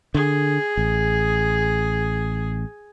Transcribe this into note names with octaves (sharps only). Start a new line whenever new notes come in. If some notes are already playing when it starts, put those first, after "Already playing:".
D3 G#4
A1